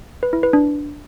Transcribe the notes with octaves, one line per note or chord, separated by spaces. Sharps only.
B4
E4
B4
D4